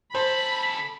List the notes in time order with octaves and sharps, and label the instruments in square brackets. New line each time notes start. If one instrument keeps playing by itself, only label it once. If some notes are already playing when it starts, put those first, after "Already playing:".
[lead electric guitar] C#3 A4 [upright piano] C5 [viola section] B5